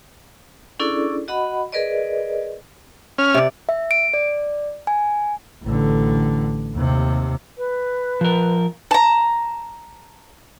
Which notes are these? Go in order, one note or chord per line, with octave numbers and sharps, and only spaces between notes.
C#4 D4 E4 G#4 A4 D5
F#4 D#5 F#5 B5
G#4 A#4 B4 D5 D#5
C#4 F6
C3 D5
E5
D7
D5
G#5
A1 D3
D#2 C3
B4
F3 A#4
A5 A#5